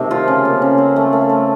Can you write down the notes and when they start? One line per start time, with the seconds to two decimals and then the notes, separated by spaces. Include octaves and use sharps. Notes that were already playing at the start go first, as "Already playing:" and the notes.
Already playing: C3 D#3 A3
0.11 F3 F4
0.28 C#3
0.45 A#3
0.62 C#3
0.78 C4
0.96 A3
1.13 A3
1.29 A3